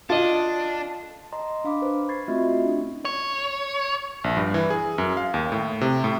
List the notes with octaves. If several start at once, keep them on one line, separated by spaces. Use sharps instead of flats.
D4 F4 A4 D#5
D#5 A5 A#5 C6
D4 F5 B5 D6
B4 C5
B5 C#6 G#6 A6 C7
A3 C4 F4 F#4 D#5 E5
C#4 D4 E4
C#5
A#1
G2
E3
G#4
F#2
F5
D#2
A2
C3
A2